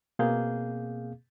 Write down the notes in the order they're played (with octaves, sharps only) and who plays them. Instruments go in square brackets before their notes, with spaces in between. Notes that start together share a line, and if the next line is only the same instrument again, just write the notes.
[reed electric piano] B2 A#3 C4 G#4 F5 G6